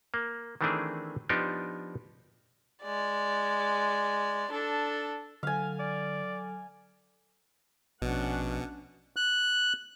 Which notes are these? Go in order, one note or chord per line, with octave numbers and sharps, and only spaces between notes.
A#3
D#3 E3 A3 C4 D4 G#4
F3 B3 D4 D#4 G4
G#3 D5
D4 A4
D3 F#3 A4 F5 G#5
D5
A#1 B2 C#4 D4 F#5
F#6